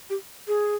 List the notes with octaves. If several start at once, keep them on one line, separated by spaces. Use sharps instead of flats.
G4
G#4